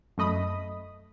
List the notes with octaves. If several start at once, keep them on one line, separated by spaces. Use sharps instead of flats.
F#2 A3 D#5 B5 D#6